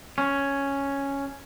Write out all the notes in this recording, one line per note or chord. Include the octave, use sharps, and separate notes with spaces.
C#4